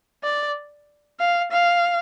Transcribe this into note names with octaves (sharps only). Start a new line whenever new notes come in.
D5
F5
F5